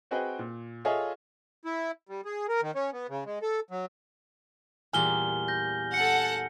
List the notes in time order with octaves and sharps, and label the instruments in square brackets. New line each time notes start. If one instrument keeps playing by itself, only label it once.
[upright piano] C4 F#4 G#4 B4 D#5 G5
A#2
F4 G#4 A4 C#5 D#5 E5
[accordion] E4
G3
G#4
A#4
D#3
C#4
B3
C#3
G#3
A4
F#3
[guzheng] E2 A#2 G3 [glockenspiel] G#5 F6 G7
[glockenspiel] G6 A#6
[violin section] A4 F#5 [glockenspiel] C#7